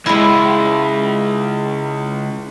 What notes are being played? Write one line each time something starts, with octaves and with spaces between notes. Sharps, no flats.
C#2 C#3 G#3 E4